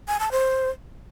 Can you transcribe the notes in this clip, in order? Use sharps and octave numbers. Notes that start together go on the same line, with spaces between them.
G#5
A5
C5